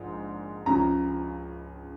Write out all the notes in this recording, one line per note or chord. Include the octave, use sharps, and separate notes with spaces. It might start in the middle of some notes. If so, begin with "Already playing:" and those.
Already playing: A#1 G#2 F3
C#2 C#3 F3 A#5